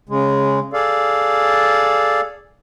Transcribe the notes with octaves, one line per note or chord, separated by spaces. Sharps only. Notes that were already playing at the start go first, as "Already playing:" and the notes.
C#3 G#3
G#4 A4 D5 F5